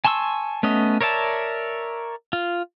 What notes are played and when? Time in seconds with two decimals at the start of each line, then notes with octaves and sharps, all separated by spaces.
0.05 G#5 A5 C6 C#6 E6
0.63 A3 B3 C#4 D#5
1.01 A#4 C#5 D5 E5 A5
2.33 F4